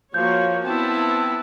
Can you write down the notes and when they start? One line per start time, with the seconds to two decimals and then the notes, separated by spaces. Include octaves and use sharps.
0.14 F3 A#3 F#4 C#5 G6
0.64 B3 C4 E4 A5